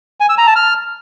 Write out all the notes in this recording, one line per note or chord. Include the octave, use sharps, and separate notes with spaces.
G#5
E6
A#5
A5
F6